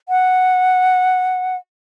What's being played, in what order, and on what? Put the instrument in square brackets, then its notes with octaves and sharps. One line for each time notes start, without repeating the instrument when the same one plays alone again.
[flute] F#5